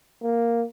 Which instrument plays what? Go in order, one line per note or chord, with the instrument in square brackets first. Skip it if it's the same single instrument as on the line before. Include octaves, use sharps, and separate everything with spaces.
[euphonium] A#3